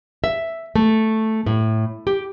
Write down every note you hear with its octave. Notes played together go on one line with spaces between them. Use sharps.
E5
A3
A2
G4